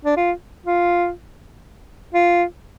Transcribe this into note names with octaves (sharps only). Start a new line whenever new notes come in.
D4
F4
F4
F4